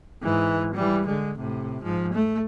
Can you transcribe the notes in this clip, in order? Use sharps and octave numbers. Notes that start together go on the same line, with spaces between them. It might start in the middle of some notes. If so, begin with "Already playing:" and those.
G#2 E3
E3 G3
D3 G#3
A2 C3
G#2 F3
A3